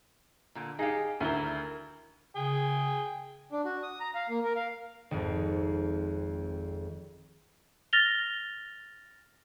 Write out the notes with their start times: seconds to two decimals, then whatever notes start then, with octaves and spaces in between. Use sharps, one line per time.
0.55 A#2 D3
0.79 D#4 G4 G#4 F5
1.20 D2 D#3 E4 A#4 G7
2.36 C#3 G#4 G5
3.52 D4
3.65 F#4
3.83 D#6
4.00 A#5
4.15 F5
4.29 A#3
4.44 A#4
4.55 F5
5.11 G#1 F2
7.93 F6 A6 A#6 F7 G7